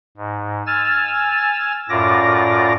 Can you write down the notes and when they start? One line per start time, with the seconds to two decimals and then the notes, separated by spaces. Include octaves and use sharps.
0.17 G#2
0.67 G#5 E6 F6 A6
1.89 F#2 A2 F4 D5 D6 A#6